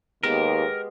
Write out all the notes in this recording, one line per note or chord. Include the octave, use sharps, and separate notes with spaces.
D#2 G#3 B3 G4 A#4